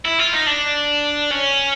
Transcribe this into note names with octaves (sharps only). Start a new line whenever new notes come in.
E4
F4
D#4
D4
C#4